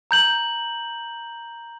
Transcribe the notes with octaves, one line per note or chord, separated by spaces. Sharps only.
A#5 G6 F#7